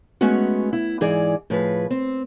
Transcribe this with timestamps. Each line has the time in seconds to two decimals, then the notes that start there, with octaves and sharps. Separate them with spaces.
0.21 G#3 A3 B3 C#4 F#4
0.73 E4
1.01 G#2 E3 G#4 D5
1.50 A2 F3 G#4 B4
1.90 C4